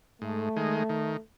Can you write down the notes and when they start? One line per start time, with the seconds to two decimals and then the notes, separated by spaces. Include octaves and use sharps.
0.21 G#2 A3
0.56 D#3 G#3
0.90 D#3